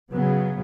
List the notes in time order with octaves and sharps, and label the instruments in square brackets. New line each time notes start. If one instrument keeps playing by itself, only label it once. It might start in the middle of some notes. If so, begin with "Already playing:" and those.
[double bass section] C#3 F#3 B3